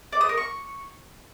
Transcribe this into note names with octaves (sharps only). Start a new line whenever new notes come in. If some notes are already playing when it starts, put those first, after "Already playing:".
D5
D#6
A#4
C#6